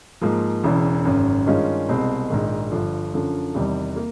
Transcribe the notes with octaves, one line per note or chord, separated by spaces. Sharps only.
G#2 F3 A#3
E1 E2 C#3 E3
G#1 F#2 C#3
G2 D#3 G#3 C#4 F4
C2 B2 G#3 C4
A#1 G#2 D#3
G1 G2 D3 F3
F#2 D3 F3
E2 C3 D#3 G3
A#3